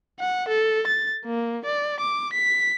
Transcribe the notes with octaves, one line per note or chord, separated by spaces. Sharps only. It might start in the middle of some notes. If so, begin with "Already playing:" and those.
F#5
A4
A6
A#3
D5
D6
B6